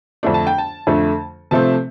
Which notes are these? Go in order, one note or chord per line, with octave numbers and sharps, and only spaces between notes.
F2 D3 A3 D4
A5
G5
A5
F2 D3 A3
C3 F3 A3 C4 A5